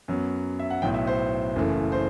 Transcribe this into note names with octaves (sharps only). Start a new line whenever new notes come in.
F#2 F#3 B3
E5
F#5
B1 A2 F#3 B3 G5
E5
C5
F#1 F#2 E3 A3
C5